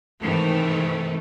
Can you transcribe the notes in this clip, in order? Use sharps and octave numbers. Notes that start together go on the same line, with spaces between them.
G#2 C3 D#3 E3 A3